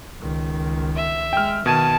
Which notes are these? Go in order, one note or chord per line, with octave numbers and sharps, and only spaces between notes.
C#2 D#3
E5
G#3 G5 F6
B2 D#3 A5 G#6 D#7